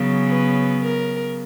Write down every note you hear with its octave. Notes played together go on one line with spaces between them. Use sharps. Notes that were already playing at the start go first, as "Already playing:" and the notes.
Already playing: C#3 F#3 B3
B4
A#4